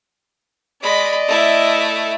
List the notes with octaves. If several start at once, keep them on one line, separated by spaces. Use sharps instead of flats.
G#3 D5 D#5 B5
A3 E4